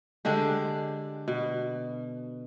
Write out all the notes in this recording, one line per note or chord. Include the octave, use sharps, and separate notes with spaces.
D3 G#3 D4 G4
B2